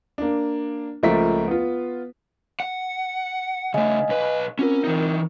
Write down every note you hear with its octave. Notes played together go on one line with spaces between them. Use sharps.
A#3 D4
C#2 F3 A3 A#3 A#4 B6
B3 F4
F#5
C#3 A3 D#5 F5 G#5
B1 B4
C4 C#4 F4 A#4
E3 D#4